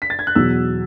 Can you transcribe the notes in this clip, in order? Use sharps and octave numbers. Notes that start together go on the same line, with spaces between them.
B6
A6
G#6
F#6
E2 B2 F#3 E6